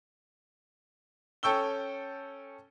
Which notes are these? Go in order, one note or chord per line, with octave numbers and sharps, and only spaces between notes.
C#4 A4 G5 C#6 E6 G7